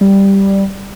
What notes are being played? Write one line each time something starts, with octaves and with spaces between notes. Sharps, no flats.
G3